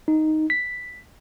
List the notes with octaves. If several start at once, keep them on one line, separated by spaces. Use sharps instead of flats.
D#4
B6